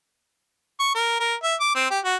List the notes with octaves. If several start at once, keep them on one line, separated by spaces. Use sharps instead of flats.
C#6
A#4
A#4
E5
D6
C4
G4
F#4